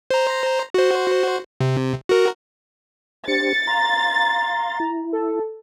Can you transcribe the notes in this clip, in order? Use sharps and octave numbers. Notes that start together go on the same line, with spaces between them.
C5 A#5
F#4 C5
C3
F#4 A#4
D4 G4 C5 A6 C#7
F5 A#5 C6
E4
A4